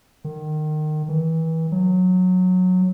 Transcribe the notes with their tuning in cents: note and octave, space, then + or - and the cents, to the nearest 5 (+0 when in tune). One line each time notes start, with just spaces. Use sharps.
D#3 -25
E3 -30
F#3 -15